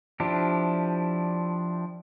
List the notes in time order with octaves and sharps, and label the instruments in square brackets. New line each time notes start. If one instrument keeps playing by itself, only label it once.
[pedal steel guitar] F3 D4 E4 G4